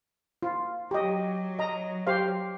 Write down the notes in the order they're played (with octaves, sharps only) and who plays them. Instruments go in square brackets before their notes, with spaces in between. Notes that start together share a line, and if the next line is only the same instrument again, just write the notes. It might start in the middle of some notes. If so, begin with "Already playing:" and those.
[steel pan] F4
[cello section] F#3 [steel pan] G4 D#5
[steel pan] D#5 A#5
G4 C5 F5